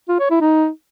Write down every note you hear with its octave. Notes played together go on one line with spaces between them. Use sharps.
F4
C#5
E4
D#4